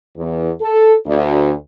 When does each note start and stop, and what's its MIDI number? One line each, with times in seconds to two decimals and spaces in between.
0.17 0.50 40
0.61 0.95 69
1.07 1.52 38